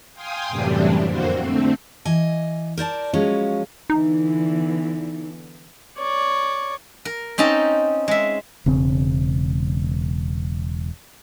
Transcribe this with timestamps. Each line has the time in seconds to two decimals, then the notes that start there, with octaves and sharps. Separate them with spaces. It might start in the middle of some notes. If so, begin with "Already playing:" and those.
0.14 F5 G5 G#5 C6 D#6
0.48 F#2 A2 C3 E3 G3 D4
1.05 F2 D3 A#3 C4 F#4 C5
1.36 D3 A3 C4
2.05 E3 D#5 G#5
2.78 A#4 C5 D5 A5
3.14 F3 F#3 G#3 C#4 F5
3.90 D3 E3 B3 D#4
5.98 C#5 D5
7.05 A#4
7.38 C4 C#4 D#4 A5 A#5
8.08 G#3 E5
8.66 E1 C#3 C4